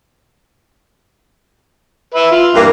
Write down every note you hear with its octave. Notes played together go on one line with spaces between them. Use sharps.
B4 E5
F4
G2 E3 A#3